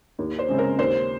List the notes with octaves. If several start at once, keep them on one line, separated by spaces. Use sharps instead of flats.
D#2
C5
C#3 G#3 C4
A#4
D#2 C5